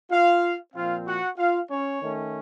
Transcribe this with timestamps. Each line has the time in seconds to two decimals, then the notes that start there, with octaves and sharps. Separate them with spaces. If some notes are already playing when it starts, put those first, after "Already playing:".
0.11 F4 F5
0.74 A#2 F3 C4 F4 F5
1.07 F#4 F#5
1.38 F4 F5
1.70 C#4 C#5
2.02 D#3 A3 C#4